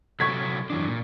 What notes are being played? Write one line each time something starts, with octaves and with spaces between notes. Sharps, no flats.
C3 F#3 A4 C#6 G#6 B6
F#2 E3 D4
A#2